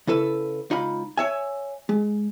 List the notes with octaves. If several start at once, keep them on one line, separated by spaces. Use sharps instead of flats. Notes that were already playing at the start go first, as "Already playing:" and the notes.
C#3 E4 A4 B4
C#2 D#4 F4 B5
C#5 E5 G#5
G#3